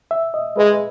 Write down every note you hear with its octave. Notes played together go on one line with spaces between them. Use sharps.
E5
D#5
G#3 B4